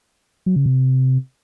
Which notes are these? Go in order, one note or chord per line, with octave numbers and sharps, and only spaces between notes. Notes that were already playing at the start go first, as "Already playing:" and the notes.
F#3
C#3
C3